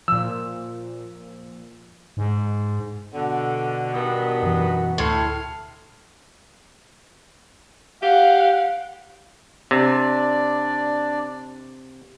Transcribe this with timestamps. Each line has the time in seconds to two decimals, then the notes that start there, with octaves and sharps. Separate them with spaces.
0.08 A#2 F3 E6
2.17 G#2
3.14 B2 D3 F#4
3.94 G2 D#3 B3
4.42 F#2 E3
4.98 D2 A2 C6 F6 C7
8.02 G4 F5 F#5
9.71 C3 D4 D5